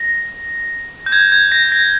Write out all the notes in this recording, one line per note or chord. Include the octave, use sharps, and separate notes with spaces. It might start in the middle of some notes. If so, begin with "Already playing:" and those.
Already playing: A#6
G6
G#6
G#6
A#6
A#6